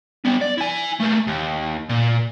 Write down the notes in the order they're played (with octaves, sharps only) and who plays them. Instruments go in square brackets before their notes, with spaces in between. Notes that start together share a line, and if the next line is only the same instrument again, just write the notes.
[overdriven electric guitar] G3 B3
D5
E4 G#5
A3 A#3
D#2
A#2